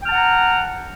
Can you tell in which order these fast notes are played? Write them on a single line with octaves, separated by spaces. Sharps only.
G5 F6 A5 F#5 A#5